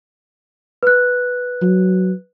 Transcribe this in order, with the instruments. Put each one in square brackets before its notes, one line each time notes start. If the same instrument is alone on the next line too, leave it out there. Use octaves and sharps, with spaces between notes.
[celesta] B4 F#6
[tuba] F#3